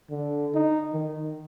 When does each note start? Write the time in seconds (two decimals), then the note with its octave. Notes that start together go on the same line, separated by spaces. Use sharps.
0.10 D3
0.55 D#4
0.93 D#3